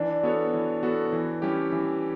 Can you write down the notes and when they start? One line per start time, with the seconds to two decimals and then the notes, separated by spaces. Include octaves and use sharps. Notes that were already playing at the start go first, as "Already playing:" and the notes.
Already playing: E3 D4
0.23 B3 F#4 A4 C#5
0.54 E3
0.83 B3 F#4 A4 C#5
1.13 E3
1.42 G3 C#4 E4 G4
1.72 E3